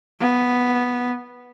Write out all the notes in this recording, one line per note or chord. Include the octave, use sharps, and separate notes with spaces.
B3